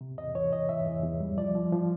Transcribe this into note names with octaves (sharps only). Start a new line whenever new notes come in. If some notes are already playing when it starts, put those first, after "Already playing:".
C3
E2 D#5
E3 C#5
E3 D#5
E3 E5
E2
E2
G3
F3 D5
F3
F3